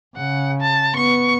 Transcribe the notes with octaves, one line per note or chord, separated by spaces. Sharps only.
C#3 F#5
A5
B3 C#6